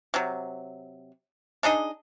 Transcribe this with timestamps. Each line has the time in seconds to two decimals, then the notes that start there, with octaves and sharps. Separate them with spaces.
0.14 C3 F#3
1.63 D4 D#4 G#4 D#5